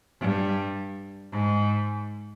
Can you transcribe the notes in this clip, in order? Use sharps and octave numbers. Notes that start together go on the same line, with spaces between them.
G2
G#2